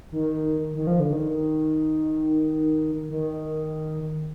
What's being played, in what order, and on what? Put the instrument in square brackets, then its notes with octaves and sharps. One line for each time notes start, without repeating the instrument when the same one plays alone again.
[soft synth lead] D#3
D#3
F3
D3
D#3
D#3